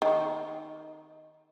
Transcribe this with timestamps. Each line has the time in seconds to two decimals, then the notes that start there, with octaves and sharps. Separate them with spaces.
0.02 D#3